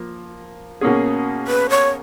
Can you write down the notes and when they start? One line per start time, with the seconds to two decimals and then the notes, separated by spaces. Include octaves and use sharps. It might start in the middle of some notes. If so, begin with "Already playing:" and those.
Already playing: F3 A#3
0.81 B2 A#3 C#4 G#4
1.47 B4
1.70 C#5